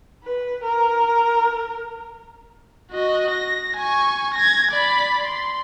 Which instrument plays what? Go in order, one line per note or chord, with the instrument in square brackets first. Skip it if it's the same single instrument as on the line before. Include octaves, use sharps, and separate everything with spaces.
[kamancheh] B4
A#4
[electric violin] F#4 D#5
A#6
G#5 C#6
G#6 A#6
D5 B5
C6